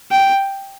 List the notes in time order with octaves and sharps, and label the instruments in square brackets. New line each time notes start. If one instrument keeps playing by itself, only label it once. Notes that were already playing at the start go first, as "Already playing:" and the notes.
[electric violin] G5